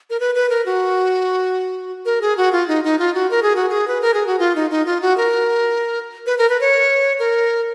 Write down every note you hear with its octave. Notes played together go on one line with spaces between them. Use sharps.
A#4
B4
B4
A#4
F#4
A#4
G#4
F#4
F4
D#4
D#4
F4
F#4
A#4
G#4
F#4
G#4
B4
A#4
G#4
F#4
F4
D#4
D#4
F4
F#4
A#4
B4
A#4
B4
C#5
A#4